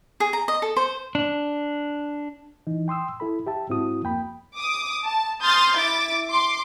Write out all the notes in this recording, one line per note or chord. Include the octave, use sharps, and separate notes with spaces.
G#4
A#5
D#5
A4
C5
D4
E3 D#4
G5 C6 D#6 E6
E4 A4 B5
G4 E5 A5
G#2 C4 E4 F#4 D#6
F2 A#3 G5 B5
D6 D#6
A5
C6 D#6 F6 G6 A6
E4 D6 A6
C6 D6